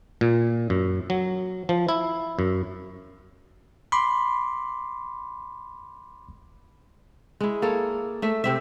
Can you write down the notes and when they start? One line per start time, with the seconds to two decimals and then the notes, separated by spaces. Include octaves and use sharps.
0.21 A#2
0.70 F#2
1.10 F#3
1.69 F3
1.89 E4
2.39 F#2
3.92 B5 C6 D6 C7
7.41 G#3 E4
7.62 A#3 G#4 A4 C#5
8.22 A3 E5
8.44 C3 C4 E5